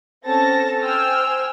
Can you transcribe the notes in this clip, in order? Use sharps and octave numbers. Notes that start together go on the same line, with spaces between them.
C4 C#4 A4 A5 A6 A#6
C5 G5 G#5 E6 F6